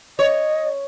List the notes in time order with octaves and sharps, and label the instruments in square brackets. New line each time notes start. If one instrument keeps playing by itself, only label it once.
[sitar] C#5 [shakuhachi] D#5